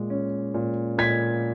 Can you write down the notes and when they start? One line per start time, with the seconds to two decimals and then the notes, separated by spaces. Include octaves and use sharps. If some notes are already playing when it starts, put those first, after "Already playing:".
Already playing: A#2 G#3
0.10 C#4
0.54 A#2
0.98 A#2 G#6 B6